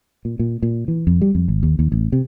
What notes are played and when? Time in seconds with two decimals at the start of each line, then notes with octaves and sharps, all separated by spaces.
0.25 A#2
0.39 A#2
0.63 A#2
0.88 E3
1.07 F2
1.21 G3
1.35 F2
1.48 G#1
1.63 D#2
1.79 D#2
1.92 A1
2.12 C3